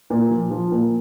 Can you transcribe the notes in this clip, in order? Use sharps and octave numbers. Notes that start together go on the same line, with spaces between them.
A#2
F3
F3
A#2